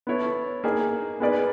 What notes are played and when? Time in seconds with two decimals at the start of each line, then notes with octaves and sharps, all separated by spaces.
0.07 B3 E4 A4 C#5
0.64 A#3 D#4 G#4
1.20 B3 D#4 G#4 B4 D5